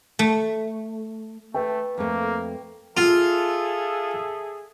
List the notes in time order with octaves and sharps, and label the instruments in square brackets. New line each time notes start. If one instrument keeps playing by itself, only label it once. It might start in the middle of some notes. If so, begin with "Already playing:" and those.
[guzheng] A3
[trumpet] A3 [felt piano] B4 G5
[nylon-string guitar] F2 A3 [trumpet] A#3
[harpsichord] F4 [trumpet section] G#4 A4 E5